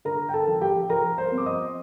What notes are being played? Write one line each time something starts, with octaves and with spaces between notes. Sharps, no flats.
D3 A#4 A#5
G5
A4 A5
F3
G4 G5
F3 A#4 A#5
C5 C6
C4
D6
D#5 D#6